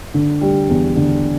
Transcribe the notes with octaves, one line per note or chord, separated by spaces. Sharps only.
D3
G3
E2
D3